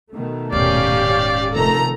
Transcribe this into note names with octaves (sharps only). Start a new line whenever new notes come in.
B2 D#3 A3
D#1 G#2 C#4 G4 D5 F5
F1 D#3 A3 A4 A#5